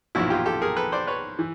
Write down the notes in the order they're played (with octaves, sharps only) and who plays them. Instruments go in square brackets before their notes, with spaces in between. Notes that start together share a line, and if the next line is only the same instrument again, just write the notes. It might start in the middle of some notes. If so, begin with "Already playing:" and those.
[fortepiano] B1 A#2 F3 E4 F#4
F4 G4
G4 A4
G#4 A#4
A4 B4
C5 D5
B4 C#5
E3